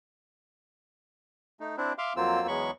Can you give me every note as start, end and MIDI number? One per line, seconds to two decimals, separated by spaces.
1.60 1.76 57
1.60 1.76 63
1.77 1.93 60
1.77 1.93 62
1.77 1.93 64
1.98 2.13 76
1.98 2.13 77
1.98 2.13 84
1.98 2.13 86
1.98 2.13 89
2.16 2.47 41
2.16 2.47 54
2.16 2.47 58
2.16 2.47 60
2.16 2.47 65
2.16 2.47 88
2.48 2.71 40
2.48 2.71 54
2.48 2.71 56
2.48 2.71 83
2.48 2.71 85